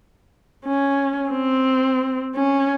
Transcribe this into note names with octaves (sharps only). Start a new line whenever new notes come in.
C#4
C4
C#4